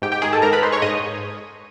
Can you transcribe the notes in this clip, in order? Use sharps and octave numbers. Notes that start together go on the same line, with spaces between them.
G#2 G4 G5
G4 G5
D#3 G#4 G#5
A4 A5
G#2 A#4 A#5
B4 B5
G#3 C5 C6
C#5 C#6
G#2 D#5 D#6